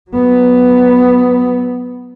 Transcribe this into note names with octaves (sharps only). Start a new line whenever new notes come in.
F#3 B3